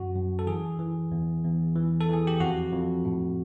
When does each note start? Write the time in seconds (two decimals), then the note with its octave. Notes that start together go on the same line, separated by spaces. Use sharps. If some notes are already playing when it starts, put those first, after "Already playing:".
Already playing: F#2 F#4
0.15 F#2
0.39 A4
0.47 E3 G#4
0.79 E3
1.12 E2
1.44 E2
1.76 E3
2.01 A4
2.09 E3 G#4
2.27 G4
2.40 F2 F#4
2.72 F2
3.05 A2